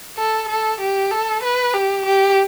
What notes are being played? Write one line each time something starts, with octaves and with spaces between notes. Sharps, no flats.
A4
A4
G4
A4
B4
G4
G4